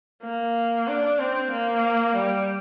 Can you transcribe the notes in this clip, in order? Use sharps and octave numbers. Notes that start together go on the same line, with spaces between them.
A#3
D4
C4
A#3
G3